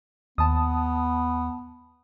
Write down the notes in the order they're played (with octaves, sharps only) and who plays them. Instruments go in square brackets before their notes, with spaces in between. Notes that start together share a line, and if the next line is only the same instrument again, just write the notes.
[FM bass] D#2 [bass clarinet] B3 [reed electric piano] A5 D#6